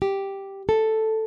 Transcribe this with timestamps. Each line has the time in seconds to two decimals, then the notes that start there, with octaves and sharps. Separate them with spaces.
0.02 G4
0.69 A4